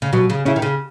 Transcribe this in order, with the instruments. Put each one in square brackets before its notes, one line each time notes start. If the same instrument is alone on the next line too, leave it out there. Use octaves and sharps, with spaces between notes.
[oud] C#3
[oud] B2 [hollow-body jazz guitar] F#3
[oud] C#3
[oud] C#3 [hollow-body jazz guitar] C#4 E4
[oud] D#3
C#3